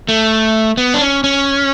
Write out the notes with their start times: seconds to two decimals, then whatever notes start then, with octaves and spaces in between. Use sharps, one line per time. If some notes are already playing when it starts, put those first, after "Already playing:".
0.09 A3
0.77 B3
0.94 D4
1.01 C#4
1.24 C#4